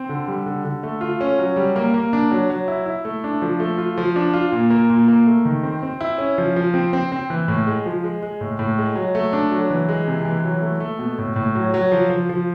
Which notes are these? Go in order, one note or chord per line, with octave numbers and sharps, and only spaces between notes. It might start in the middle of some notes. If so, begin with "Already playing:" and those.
Already playing: C4
D3
G3
D3
D3
A3
F4
C#4
F#3
G3
A#3
A#3
D4
F#3
F#3
E4
E4
A3
D4
F3
A3
F4
F3
D4
F4
A#2
A#3
A#2
A#3
A3
D#3
C4
C4
E4
C#4
F3
F3
C4
C4
C4
E3
A2
G#3
F3
G#3
G#3
A2
A2
G#3
F#3
A3
D4
F#3
E3
G#3
C3
E3
F#3
A3
A3
B2
A2
A2
F#3
F#3
F3
F3
F3